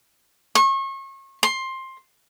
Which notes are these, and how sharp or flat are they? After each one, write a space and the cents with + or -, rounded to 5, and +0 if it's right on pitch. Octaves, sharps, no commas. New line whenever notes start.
C#6 -35
C6 +15